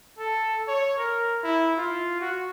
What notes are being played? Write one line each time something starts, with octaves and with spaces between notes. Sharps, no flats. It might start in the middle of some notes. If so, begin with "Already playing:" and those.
A4
C#5
A#4
E4
F4
F#4